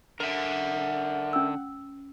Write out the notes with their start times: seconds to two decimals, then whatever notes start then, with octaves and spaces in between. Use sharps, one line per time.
0.20 D3 A#4 E5 F#5
1.33 C#4 E6